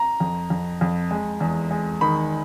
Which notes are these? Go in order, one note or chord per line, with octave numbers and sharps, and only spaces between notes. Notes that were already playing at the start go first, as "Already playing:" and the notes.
Already playing: A#5
F2
F2
F2
G#3
E2
G#3
D#3 B5